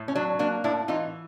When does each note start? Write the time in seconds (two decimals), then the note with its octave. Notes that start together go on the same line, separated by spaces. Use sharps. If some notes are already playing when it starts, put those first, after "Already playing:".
Already playing: A2
0.08 C#4
0.15 F#3 D4
0.39 A#3 D4
0.64 A2 D4 E4
0.88 E3 D#4 F4